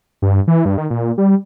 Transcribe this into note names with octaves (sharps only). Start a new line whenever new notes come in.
G2
E3
G2
D#3
A#2
G3